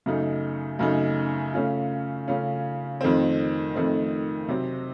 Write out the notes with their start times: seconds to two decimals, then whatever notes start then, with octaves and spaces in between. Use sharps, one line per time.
0.06 F#2 C#3 A3 D#4
0.79 F#2 C#3 A3 D#4
1.54 C#3 A3 C#4 F4
2.28 C#3 A3 C#4 F4
3.01 F2 D#3 A3 C4
3.75 F2 D#3 A3 C4
4.48 C3 F#3 C4